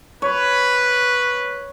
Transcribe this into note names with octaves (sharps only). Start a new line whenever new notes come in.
B4 C#5